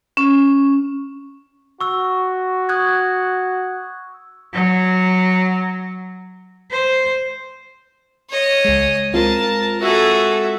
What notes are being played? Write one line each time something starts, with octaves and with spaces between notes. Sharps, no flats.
C#4
F#4 C#6 E6
D#6 F#6 G#6
F#3
C5
C#5 D#5
C#2 G#3
G#3 C4 F4 A#4 A5
F#4 G#4 A4 E5